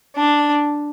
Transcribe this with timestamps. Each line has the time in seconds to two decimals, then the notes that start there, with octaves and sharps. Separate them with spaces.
0.16 D4